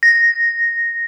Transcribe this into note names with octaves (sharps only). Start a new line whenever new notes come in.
A#6